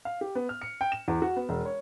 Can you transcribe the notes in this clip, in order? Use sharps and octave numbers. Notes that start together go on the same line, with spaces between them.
F5
G4
B3
F6
C#7
G5
E7
E2
F#4
B3
E1
C#5